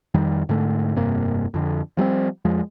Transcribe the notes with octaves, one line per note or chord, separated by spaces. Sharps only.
F2 D#3 G3
G#2 D3 A3
F1 G2 C3 A#3
F2 D3
F3 G3 A#3 C4
F2 F3 G#3